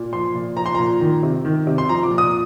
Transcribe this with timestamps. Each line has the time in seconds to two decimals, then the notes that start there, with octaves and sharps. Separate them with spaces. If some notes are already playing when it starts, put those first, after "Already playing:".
Already playing: A#2
0.13 F3 C6
0.35 A#2
0.57 F3 A#5
0.66 C6
0.75 A#2 A#5
1.01 D#3
1.23 C3
1.45 D#3
1.67 C3
1.78 C6
1.89 F3 A#5
2.03 D6
2.11 A#2
2.18 D#6